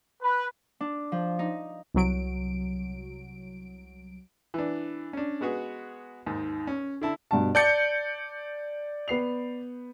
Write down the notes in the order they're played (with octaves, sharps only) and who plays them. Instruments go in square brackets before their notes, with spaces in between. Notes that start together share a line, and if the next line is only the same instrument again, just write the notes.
[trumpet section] B4
[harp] D4
F3
D#4
[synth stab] C2 F#3 D7
[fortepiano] E3 D4
C#4 D4
G#3 B3 F#4 G#4
D#2 G#2
C#4
D3 E4 A5
[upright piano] G2 B2 A5
[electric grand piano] D5 G6 C#7 [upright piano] A5 D6 A6
[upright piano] B3 C7 F7